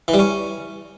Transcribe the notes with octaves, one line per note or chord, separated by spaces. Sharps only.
E3
G3
C#4